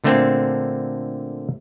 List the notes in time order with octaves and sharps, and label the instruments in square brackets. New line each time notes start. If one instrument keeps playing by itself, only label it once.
[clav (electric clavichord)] A#2 D3 A3 A#3 C4